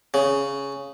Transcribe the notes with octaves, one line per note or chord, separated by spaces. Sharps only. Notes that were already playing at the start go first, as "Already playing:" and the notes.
C#3